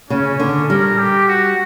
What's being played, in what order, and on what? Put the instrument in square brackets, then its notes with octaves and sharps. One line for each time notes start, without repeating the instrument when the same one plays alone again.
[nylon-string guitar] C#3 [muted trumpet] C#4
[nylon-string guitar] D3
[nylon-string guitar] G3 [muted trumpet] A#4
[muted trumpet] G4
F#4